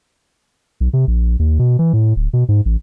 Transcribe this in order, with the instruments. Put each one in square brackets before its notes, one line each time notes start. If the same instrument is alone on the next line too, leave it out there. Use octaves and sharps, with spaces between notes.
[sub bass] B1
C3
A#1
D#2
B2
E3
A2
D1
B2
G#2
A1